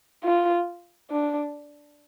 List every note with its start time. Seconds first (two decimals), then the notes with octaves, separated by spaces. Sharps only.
0.24 F4
1.11 D4